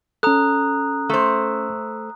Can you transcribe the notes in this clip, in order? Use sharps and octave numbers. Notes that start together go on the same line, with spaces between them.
C#4 A4 A#5 D#6 F#6
A3 C5